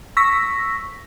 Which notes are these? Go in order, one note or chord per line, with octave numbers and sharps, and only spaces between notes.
C#6 E6 A#6 B6